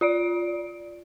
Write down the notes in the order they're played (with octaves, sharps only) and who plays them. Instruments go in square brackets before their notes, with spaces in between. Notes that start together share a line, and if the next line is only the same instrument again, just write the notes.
[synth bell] F4 D5 D7